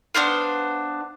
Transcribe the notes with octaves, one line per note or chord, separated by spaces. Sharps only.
B3 D4 C5 F5